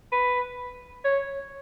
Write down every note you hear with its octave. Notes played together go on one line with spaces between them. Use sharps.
B4
C#5